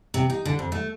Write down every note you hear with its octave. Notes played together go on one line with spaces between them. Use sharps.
C3
D#4
D3
F2
A3